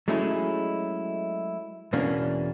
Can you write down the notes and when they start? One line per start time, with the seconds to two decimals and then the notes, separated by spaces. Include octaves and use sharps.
0.08 F#3 G#3 A3 C#4 D#4 E4
1.93 E2 B2 E3 A#3 C#4 D4